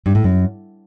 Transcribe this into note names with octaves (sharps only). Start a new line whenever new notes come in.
G2
A2
F#2